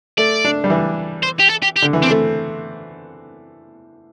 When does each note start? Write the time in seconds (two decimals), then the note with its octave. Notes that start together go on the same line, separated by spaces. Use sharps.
0.18 A3 D5
0.45 D4
0.64 G3
0.70 E3
1.23 C5
1.39 G4
1.49 A4
1.62 G4
1.76 G4
1.82 D3
1.93 E3
2.02 C4 D4
2.10 A3